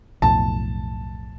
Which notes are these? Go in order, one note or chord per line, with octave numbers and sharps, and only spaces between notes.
B1 F2 A2 A5